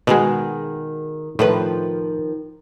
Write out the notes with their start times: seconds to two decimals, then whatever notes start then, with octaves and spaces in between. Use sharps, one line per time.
0.07 B2 D#3 G#3 F#4 G#4
1.39 A2 D#3 F3 B4